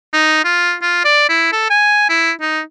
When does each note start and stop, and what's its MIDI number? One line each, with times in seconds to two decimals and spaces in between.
0.13 0.42 63
0.44 0.75 65
0.82 1.02 65
1.04 1.25 74
1.29 1.48 64
1.53 1.67 69
1.70 2.06 80
2.09 2.32 64
2.41 2.61 63